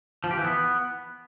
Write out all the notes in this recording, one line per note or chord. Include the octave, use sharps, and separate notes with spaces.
F3
G4
E3
B3